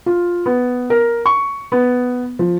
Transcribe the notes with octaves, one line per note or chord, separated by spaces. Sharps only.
F4
B3
A#4
C#6
B3
F3